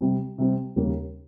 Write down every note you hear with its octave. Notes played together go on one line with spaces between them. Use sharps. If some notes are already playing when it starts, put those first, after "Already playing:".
C3 G3 C4
C3 G3 C4
D#2 C#3 G3 A#3